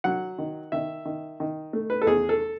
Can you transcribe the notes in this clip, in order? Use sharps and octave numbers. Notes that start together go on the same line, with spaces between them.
F#3 F#5
D#3
D#3 E5
D#3
D#3
A3
B4
A4
E2 G#4
A4